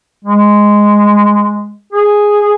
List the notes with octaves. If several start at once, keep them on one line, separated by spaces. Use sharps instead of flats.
G#3
G#4